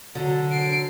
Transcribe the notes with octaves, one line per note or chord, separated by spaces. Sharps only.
D3 F#3
C7 D7